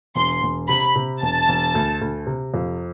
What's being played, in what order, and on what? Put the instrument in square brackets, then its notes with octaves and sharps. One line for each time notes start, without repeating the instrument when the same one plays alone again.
[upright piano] E1 [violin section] C6
[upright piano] E1
[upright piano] C3 [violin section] B5
[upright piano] C3
[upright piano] E1 [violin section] A5
[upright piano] E1
D2
D2
C3
F2